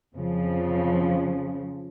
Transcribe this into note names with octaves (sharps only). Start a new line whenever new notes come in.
F2 C#3 F3